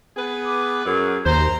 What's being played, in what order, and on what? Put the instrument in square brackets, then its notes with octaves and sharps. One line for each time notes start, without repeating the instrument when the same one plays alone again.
[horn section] B3 G#4 B4
[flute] D6
[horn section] F#2 [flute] G#4
[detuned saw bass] D#2 [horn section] C5 [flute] A#5